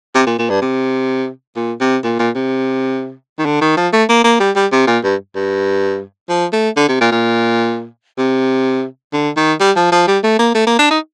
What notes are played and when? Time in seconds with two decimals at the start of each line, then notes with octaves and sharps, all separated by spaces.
0.15 C3
0.27 A#2
0.39 A#2
0.50 G2
0.62 C3
1.56 A#2
1.81 C3
2.04 A#2
2.19 A#2
2.35 C3
3.39 D#3
3.46 D3
3.61 D#3
3.77 F3
3.93 A3
4.09 A#3
4.24 A#3
4.40 G3
4.56 G3
4.72 C3
4.87 A#2
5.04 G2
5.35 G2
6.29 F3
6.53 A3
6.77 D3
6.89 C3
7.01 A#2
7.12 A#2
8.18 C3
9.13 D3
9.37 D#3
9.60 G3
9.76 F3
9.92 F3
10.07 G3
10.23 A3
10.39 A#3
10.55 A3
10.67 A#3
10.79 D4
10.90 D#4